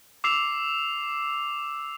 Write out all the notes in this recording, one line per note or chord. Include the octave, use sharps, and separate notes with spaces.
D6 E6 C7 F7